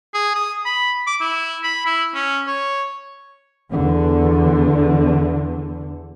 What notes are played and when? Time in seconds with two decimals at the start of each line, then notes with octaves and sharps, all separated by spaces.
0.14 G#4
0.35 D#6
0.65 B5
1.07 D6
1.21 E4
1.63 B5
1.86 E4
2.14 C#4
2.47 C#5
3.70 E2 D3